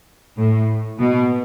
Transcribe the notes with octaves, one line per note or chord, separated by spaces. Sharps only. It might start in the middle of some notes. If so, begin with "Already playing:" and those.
A2
B2